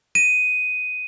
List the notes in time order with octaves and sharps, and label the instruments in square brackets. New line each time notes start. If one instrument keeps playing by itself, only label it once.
[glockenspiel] D#7